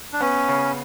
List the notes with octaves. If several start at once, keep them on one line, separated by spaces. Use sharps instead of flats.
D4
B3 C#4
C#3